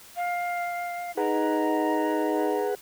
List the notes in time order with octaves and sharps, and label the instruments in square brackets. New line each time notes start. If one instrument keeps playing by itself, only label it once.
[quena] F5
[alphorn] D#4 [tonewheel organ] G#4 B4 F#5 [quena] A#5